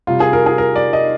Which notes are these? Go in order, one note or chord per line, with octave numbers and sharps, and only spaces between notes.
C3 G3 F4
G#4
A#4
G#4
A#4
D5
D#5